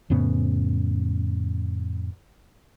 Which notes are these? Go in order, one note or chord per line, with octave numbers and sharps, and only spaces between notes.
F2 A2 C#3 B3